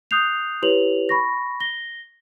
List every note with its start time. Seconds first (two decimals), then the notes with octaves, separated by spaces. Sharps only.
0.11 D#6 F#6 G6 C7 F7
0.62 E4 G4 B4 C#5 F7 F#7
1.09 B5 C#6 A#6
1.60 A#6 G7